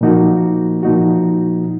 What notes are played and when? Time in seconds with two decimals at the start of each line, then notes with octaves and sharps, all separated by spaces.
0.01 A#2 F3 A#3 D#4 F#4
0.83 A#2 F3 A#3 D#4 F#4